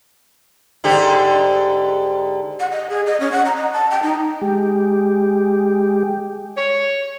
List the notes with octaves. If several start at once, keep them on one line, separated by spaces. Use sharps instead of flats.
G#2 D3 G4
F#5
D#5
G#4
D#5
C#4
F#5
A#5
D#5
A5
G5
D#4
G#3 G4
C#5